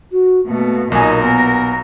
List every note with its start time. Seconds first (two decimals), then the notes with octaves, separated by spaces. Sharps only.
0.12 F#4
0.47 B2 A3 A#3
0.92 B1 A#2 D#4 A#4 G#5
1.22 B3 A#4